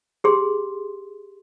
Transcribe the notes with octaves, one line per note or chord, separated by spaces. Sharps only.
G4 G#4 C6